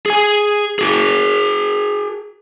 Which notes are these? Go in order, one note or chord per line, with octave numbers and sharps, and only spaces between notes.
G#4 G#5
F#4 G#4